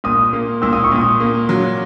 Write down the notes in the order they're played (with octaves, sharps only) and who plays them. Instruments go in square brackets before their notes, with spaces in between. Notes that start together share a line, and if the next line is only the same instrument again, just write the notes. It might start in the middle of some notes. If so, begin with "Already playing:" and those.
[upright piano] A#2 [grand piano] D#6
[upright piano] A#3
[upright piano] A#2 [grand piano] E6
[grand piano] D#6
C#6
[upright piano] A#2 [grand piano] D#6
[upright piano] A#3
F#3